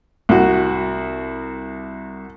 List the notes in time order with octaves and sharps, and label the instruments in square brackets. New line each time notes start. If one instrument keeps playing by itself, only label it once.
[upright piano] C2 F#4